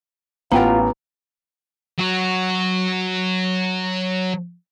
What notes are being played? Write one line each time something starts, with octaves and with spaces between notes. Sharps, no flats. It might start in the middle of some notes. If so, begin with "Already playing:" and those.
A1 B3 F4 A#4 F#5 G5 A#5
F#3 F#4